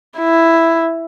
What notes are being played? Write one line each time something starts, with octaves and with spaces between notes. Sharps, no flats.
E4